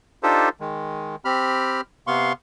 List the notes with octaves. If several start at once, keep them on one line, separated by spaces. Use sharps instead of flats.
D4 D#4 F4 G4 A4 C5
D#3 G#3
C4 G4 B5 F6
C3 B3 F5 C6 C#6